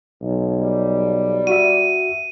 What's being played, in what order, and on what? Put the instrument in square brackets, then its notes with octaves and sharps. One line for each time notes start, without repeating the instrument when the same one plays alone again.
[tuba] B1
[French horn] G3
[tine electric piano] F#4 E5 [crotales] D#7